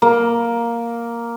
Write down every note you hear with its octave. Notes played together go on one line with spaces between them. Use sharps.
A#3